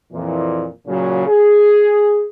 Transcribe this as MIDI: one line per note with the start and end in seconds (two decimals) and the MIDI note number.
0.13 0.67 41
0.13 0.67 46
0.13 0.67 52
0.87 1.26 46
0.87 1.26 49
0.87 1.26 54
1.27 2.25 68